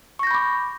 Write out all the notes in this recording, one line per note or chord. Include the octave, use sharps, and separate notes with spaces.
B5 C#6 D6 G6 A#6